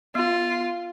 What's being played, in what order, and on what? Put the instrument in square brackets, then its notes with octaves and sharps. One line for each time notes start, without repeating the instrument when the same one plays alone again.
[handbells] B3 [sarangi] F4